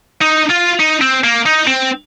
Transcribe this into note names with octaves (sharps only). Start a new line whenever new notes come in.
D#4
F4
D#4
C4
A#3
D#4
C4